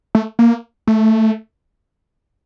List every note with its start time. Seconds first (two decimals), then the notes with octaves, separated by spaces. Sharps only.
0.15 A3
0.39 A#3
0.87 A3